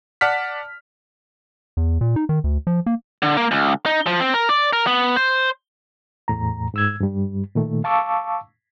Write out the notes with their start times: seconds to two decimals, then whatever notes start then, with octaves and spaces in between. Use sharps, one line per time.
0.21 D5 F#5 A5 F6 B6
1.77 E2
2.01 A#2
2.16 D#4
2.29 D#3
2.44 D2
2.67 F3
2.86 A#3
3.23 D3
3.37 A#3
3.52 C#2
3.86 D#4
4.07 F3
4.20 C4
4.34 A#4
4.49 D5
4.73 A#4
4.87 B3
5.16 C5
6.28 E2 A2 A#5
6.74 G#2 E6 G#6
7.00 G2 G3
7.55 A#2 D#3 A3
7.84 F5 A5 C#6 D6 E6